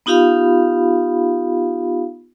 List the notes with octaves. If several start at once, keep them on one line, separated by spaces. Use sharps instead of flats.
B3 D#4 F4 G4 F5 B5